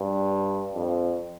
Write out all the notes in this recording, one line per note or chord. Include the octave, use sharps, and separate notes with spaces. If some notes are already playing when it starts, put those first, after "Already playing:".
Already playing: G2
F2